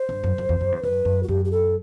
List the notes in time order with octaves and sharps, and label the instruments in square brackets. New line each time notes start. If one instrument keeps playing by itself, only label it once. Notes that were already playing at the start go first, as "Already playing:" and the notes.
Already playing: [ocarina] C5
[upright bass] G2
F#2
F#2
E2
F#2
E2
[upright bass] F#2 [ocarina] B4
[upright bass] F#2
[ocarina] F#4
[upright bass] F#2 [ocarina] G4
[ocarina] G4
A4